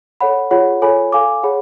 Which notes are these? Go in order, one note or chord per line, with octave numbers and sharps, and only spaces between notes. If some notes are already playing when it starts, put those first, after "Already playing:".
A4 C#5 F#5 B5
F4 G#4 C#5 F#5 B5
F4 A4 C#5 G#5 B5
A4 F5 G#5 D6
G#4 C#5 F#5 B5